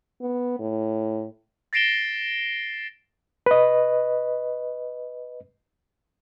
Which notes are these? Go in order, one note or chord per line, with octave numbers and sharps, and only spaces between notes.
B3
A2
A6 A#6 C7 D7 E7 G7
B4 D#5